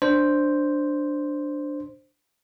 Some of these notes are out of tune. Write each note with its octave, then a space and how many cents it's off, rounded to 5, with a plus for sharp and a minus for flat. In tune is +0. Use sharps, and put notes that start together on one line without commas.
D4 +5 C5 +0